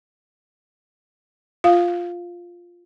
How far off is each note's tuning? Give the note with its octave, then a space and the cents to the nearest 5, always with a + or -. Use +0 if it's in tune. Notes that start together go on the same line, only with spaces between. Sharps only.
F4 +0 F5 +0